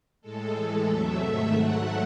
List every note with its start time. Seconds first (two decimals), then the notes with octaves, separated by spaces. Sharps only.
0.21 A2 G#3 A4
0.54 A2 E3 G#3 A4
0.87 E2 C3 F#3 A3 E5
1.20 G#2 D#3 A3 E5
1.53 G#2 F#3 A3 F#5